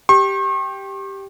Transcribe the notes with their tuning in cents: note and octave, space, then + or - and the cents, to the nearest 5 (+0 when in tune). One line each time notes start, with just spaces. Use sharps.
G4 +0 C#6 -45